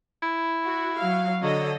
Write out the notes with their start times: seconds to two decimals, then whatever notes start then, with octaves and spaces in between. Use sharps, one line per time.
0.22 E4
0.64 F#4
0.98 F#3 F5
1.42 D3 F#3 A4 D#5